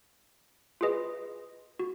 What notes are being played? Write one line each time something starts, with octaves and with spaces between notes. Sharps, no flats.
F4 G#4 B4 D#5
F#4